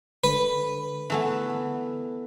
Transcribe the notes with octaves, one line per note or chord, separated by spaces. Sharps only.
D3 B4
E3 A3 B3